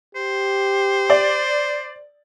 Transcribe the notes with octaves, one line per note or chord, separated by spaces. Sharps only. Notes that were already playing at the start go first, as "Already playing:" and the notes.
G4 C5
D5